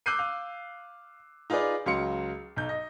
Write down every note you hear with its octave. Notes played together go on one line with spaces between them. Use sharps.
D6 E6 F#6 G6 C7 D#7
F5
D#4 F4 G#4 B4 D5
C#2 F#3 F5 C6 C#7
B1 G6
D#5